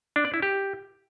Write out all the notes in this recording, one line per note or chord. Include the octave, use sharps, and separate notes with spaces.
D4
D5
E4
G4